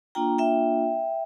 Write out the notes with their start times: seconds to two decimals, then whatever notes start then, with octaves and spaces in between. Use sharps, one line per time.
0.15 A#3 D4 F4 G5 A#5
0.38 E5 G5